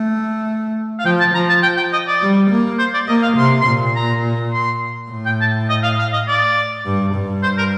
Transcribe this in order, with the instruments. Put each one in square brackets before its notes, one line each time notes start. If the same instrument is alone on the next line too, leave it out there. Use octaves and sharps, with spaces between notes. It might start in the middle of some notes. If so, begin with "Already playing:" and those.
Already playing: [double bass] A3
[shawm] F5
[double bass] F3 [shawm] G5
[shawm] A5
[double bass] F3 [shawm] A#5
[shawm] A5
G5
G5
D#5
D5
[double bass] G3
A#3
[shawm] C5
D5
[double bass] A#3 [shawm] D#5
[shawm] F5
[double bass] C3 [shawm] C6
[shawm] C6
[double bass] A#2
[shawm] A#5
C6
[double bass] A2
[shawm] G5
A5
D#5
F5
F5
D#5
D5
[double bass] G2
G2
[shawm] C5
A#4